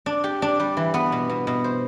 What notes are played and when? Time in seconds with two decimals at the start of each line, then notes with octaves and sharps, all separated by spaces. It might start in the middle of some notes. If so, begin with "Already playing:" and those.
0.06 D4
0.24 G4
0.42 D4
0.60 G3
0.77 E3
0.94 B3
1.12 B2
1.29 B2
1.47 B2
1.64 C5